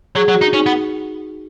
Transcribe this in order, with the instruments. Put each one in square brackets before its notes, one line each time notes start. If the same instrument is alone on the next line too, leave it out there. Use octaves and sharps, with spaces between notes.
[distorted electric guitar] F#3 [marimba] G#4
[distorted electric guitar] F#3
[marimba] F#4
[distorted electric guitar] D#4
[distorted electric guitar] C#4 [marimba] D#4
[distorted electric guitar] B3